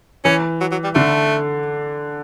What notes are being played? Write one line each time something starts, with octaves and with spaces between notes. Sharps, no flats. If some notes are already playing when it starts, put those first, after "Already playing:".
E3 C#4
F#3
F#3
G3
D3 A3